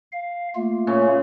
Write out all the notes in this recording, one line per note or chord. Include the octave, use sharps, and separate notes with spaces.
F5
A3 A#3 F4
A#2 C#3 C#4